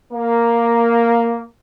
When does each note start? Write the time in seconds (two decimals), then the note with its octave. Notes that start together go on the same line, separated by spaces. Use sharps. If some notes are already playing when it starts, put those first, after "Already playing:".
0.12 A#3